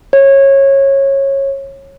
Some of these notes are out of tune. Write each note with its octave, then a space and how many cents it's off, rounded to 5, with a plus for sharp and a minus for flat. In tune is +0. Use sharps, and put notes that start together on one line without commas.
C#5 -20